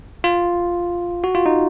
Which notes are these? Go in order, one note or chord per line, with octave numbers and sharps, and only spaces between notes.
F4
F#4
F4
D#4